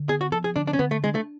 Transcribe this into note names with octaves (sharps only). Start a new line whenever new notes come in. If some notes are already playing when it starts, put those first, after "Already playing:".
Already playing: D3
B3 G#4
F#4
F3 A4
G#4
D3 D4
D4
C#4
D3 B3
A3
G#3 D4
A3